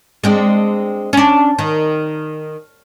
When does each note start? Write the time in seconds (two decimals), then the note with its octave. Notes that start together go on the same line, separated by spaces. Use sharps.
0.24 G#3 C4 D4
1.13 C#4 D4
1.58 D#3